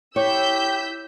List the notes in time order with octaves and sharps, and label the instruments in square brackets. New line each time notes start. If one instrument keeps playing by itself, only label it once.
[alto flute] E4 [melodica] G4 [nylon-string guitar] C#5 [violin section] E6 G6 B6